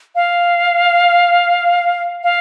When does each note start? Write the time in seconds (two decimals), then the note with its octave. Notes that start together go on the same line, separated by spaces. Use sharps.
0.15 F5
2.23 F5